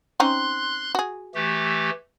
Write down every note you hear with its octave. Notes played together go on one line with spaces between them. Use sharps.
C4 C#4 D#4 C6 F#6
F#4 G#4
E3 A3 G4